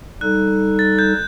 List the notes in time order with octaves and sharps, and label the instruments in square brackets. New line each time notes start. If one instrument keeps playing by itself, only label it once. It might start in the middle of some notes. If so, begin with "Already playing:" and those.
[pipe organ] G3 D#4 A4 [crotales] F#6
[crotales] A6
G6